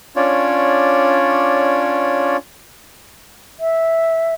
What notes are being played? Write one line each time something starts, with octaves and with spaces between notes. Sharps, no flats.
C#4 D4 F4 C#5 D5
E5